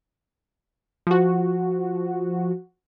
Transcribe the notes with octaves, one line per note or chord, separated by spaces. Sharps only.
F3 F#4